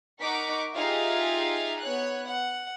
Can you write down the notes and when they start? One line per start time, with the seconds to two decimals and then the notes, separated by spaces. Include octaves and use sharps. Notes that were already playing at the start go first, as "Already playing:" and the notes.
0.21 D#4 A#4 F#5 C#6 D6 B6
0.75 D#4 F4 G4 G#4 E5 F5
1.81 B3 C#5 F#6
2.28 F#5